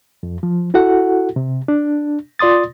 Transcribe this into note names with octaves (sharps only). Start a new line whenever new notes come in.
F2
F3
E4 F#4 A4 F#5
C3
D4
F4 D5 C6 D#6 A6